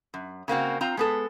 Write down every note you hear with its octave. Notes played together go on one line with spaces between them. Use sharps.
F#2
C#3 A#3 C4 F#4
C4 F4 A#5
G#3 B3 A4